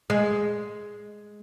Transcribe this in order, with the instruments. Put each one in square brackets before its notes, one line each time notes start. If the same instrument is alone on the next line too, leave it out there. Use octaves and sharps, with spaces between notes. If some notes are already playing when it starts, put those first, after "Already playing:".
[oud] G#3